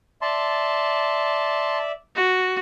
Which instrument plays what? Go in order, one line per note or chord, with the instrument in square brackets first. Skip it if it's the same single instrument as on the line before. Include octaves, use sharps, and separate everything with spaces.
[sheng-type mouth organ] D5 E5 [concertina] A5 C6
[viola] F#4